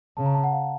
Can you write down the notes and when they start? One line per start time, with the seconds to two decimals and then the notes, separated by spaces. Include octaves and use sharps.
0.17 C#3 A5
0.26 A#5
0.34 A5
0.44 F#5
0.53 F5